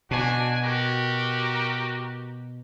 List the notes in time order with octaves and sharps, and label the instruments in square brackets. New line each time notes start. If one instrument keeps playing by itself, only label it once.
[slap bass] B2 [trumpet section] D4 F#4 G#5
[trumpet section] F#4 G4 A#4